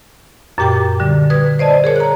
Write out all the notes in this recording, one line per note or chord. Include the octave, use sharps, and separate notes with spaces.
F#2 A#2 G4 G5 D6
D3 G3
B4 D#6 G#6
C5 D5 D#5 A5
G#4 A#4 C#5
A#5 F#6